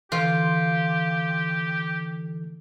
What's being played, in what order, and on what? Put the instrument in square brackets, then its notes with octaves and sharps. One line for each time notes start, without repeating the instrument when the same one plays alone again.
[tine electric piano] D3 E3 A4 [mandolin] F4 [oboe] G4